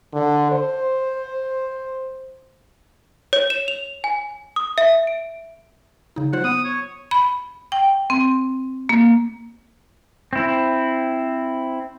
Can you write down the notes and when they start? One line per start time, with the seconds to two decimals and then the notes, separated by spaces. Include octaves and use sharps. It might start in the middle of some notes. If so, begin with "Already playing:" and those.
0.13 D3
0.52 C5
3.33 C#5
3.50 E7
3.68 F7
4.04 G#5
4.56 D#6
4.78 E5
5.07 D7
6.16 C#3 D#4
6.33 F#3 F4 C5 F#5
6.44 B3 D#6
6.64 C#5
7.11 B5
7.72 G5
8.10 C4
8.89 A#3
10.33 C4 E4